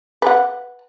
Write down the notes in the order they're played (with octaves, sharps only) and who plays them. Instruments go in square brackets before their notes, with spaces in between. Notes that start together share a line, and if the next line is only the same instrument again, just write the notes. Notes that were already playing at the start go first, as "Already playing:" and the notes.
[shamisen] B4 F#5